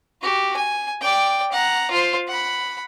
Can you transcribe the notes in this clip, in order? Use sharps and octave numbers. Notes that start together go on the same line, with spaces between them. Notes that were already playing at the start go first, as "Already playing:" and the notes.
F#4 G4
G#5
D5 G5
F#5 A#5
F4 C5
F#5 B5